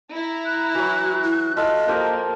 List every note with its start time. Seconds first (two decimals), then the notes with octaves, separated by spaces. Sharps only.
0.14 E4 A#5
0.45 F#6
0.75 E3 F#3 F#4
1.24 E4
1.57 F4 A4 D#5 E5
1.88 F3 A#3 G4 A#4